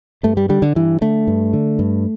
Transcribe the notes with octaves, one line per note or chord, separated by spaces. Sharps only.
G2 A3
G3
D3 G3
D3
G2 E3
D3 A3
G2
D3
G2